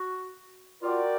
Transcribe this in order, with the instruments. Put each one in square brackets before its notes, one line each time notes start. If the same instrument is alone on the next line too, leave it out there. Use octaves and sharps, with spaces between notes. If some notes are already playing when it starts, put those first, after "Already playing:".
Already playing: [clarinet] F#4
[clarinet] F4 [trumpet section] F#4 A#4 D5 G5